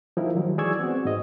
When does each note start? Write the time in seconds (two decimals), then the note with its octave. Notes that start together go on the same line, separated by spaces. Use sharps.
0.17 F3 D#4 E4 G4 A#4
0.35 D#3 F#3 G#3
0.58 E3 G#4 D5 C#6 E6 G#6
0.79 B3 C4 F#4
1.05 G#2 G#3 D#5